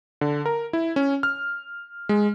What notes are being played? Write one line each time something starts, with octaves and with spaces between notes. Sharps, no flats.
D3
A#4
E4
C#4
F6
G#3